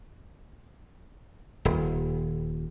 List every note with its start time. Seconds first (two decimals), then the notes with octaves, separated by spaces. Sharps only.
1.65 D#1